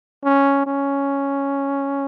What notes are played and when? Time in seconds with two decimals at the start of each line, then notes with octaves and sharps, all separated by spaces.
0.25 C#4
0.67 C#4